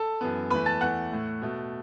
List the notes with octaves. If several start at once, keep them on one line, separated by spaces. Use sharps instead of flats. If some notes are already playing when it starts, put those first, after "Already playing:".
Already playing: A4 A5
F#2 E3 B3
E2 E3 A3 B4 B5
A5 A6
E2 E3 A3 F#5 F#6
A2 A3
B2 A3